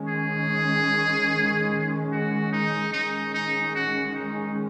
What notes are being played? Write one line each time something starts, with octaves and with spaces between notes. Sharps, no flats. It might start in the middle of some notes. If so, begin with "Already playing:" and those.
Already playing: D#3 G#3 C#4
G#4
F#4
D#4
D#3 G#3 C#4 D#4
D#4
F#4
D#4